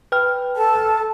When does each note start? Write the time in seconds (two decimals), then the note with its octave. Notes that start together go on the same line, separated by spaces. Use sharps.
0.12 B4 G5 F6
0.56 A4 A5